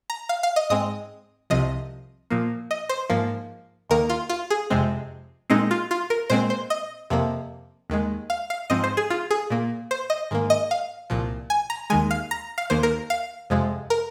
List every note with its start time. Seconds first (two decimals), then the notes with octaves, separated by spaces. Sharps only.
0.10 A#5
0.29 F5
0.43 F5
0.56 D#5
0.70 G#2 G#3 C4 D#5
1.50 C2 C3 F3 D#5
2.30 A#2 F3 A#3
2.71 D#5
2.89 C5
3.10 G#2 F3 A#3
3.90 D#2 D#3 A#3 A#4
4.09 F4
4.29 F4
4.50 G#4
4.70 F2 C3 G#3 C4
5.50 A#2 G#3 C4 D#4
5.71 F4
5.91 F4
6.10 A#4
6.30 A#2 G#3 C4 C5
6.50 C5
6.70 D#5
7.10 F2 C3 F3 A#3
7.90 D#2 D#3 G#3
8.30 F5
8.50 F5
8.70 G#2 F3 C4 D#5
8.84 C5
8.97 G#4
9.10 F4
9.31 G#4
9.50 A#2 A#3
9.91 C5
10.10 D#5
10.31 G#2 D#3 A#3
10.50 D#5
10.71 F5
11.10 C2 A#2 F3
11.50 G#5
11.70 A#5
11.90 D#2 D#3 G#3 G#5
12.11 F5
12.31 A#5
12.58 F5
12.70 D#2 D#3 A#3 C5
12.83 A#4
13.10 F5
13.50 F2 C3 F3 G#3
13.90 A#4